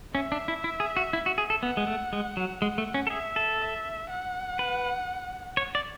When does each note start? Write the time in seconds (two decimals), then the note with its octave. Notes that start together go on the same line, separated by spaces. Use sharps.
0.14 C#4 E5
0.32 D4
0.48 E4
0.64 E4
0.80 G#4
0.97 F#4
1.13 E4
1.26 F#4
1.38 G#4
1.50 A4
1.63 B3 F#5
1.77 G#3
1.87 A3
2.13 G#3
2.37 F#3
2.61 G#3 F#5
2.78 A3
2.94 C#4
3.07 A4
3.10 G#4 E5
3.36 A4
3.61 E5
4.10 F#5
4.59 B4
5.57 C#5
5.75 D5